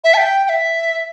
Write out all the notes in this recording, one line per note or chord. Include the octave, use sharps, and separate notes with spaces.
E5
A5
G5
G5
E5